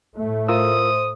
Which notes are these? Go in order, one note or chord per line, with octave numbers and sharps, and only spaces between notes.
A2 A3
F4 A#4 C5 D#6 E6